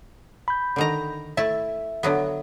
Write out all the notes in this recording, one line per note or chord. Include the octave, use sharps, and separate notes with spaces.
B5 G6
D3 D#3 A#5
A3 E4 E5 A5
D3 F#3 B3